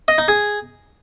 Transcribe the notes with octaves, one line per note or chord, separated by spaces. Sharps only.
D#5
D#4
G#4